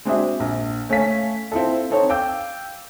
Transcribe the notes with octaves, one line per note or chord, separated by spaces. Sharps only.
G#3 C4 D4 F#4 G#4 E5
A#1
A3 C#4 A4 F5 G#5 B6
C4 E4 F4 A4
C4 D#4 A4 C#5
F5 G5 D6 E6 G6